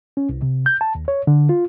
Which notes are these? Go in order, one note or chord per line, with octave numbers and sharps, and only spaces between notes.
C#4
C2
C3
G6
A5
D#2
C#5
D3
F4